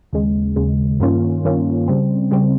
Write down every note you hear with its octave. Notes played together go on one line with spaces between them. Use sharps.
D#2 C#3 G#3
D#2 C#3 G#3
G2 D#3 A#3 C#4 F4
G2 D#3 A#3 C#4 F4
C#3 G3 C4
C#3 G3 C4